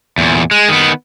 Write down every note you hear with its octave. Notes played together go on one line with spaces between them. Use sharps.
E2 A#2
G#3
D#3 B3